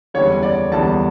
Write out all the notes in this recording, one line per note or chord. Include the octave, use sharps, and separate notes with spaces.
F#1 E2 D3 G3 C#5
D5
F#1 E2 D3 G3 A5